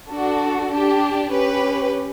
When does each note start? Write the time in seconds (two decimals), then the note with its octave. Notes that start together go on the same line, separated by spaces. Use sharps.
0.10 D4 F#4 A4
0.72 D4 G4
1.33 C#4 G4 B4